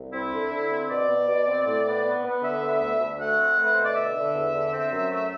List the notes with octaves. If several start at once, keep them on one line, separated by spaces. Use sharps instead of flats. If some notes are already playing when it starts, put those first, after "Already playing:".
Already playing: C2
C4 E4
D3
D3
C4
B2 D5
B2
B2
C4
A2
B3
B3
B3
D3 E5
B3
D2
D2
A3 F#5
C4
A3 B4
B2 C5
D5
D3 E5
D3
E2
D3
C4
F#2
A3